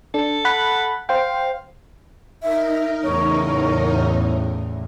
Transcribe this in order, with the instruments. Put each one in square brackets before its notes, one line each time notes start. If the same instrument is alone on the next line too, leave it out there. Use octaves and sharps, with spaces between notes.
[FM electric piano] D4 [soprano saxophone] A4
[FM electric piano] F#5 B5 F#6
[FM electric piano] C5 G5 [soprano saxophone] F5
[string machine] D#4 A#4 [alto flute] E5
[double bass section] E2 A2 C#3 [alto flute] C#5